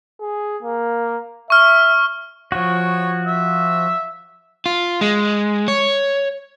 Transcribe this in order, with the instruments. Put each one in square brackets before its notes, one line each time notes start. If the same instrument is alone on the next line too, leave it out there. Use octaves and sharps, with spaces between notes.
[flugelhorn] G#4
A#3
[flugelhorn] E5 [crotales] C#6 F6
[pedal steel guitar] F3 F#4 [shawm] C#5
[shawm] E5
[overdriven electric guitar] F4
G#3
C#5